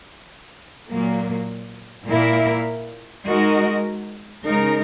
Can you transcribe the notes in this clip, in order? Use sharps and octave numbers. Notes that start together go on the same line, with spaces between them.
A#2 F#3 A#3
A#2 A#3 E4 A#4 E5
G#3 D#4 F#4 A#4 D#5
C#3 G#3 D#4 A#4